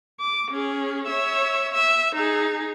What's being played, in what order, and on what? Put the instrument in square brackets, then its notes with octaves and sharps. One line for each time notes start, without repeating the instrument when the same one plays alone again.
[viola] D6
C#4 G#4
C#5 E5
E5
D#4 G#4